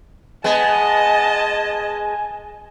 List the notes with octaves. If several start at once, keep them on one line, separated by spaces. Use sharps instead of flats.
G#3 B3 D#5 G#5 A5